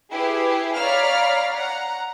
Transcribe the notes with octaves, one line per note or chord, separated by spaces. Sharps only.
E4 G4 G#4 B4
C#5 D5 F5 A#5 B5 F6
F#5 A#5